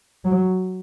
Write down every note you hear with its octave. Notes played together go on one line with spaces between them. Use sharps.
F#3